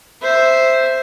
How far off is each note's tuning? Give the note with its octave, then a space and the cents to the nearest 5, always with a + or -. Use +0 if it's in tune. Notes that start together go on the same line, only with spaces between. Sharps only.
C5 +0 E5 +0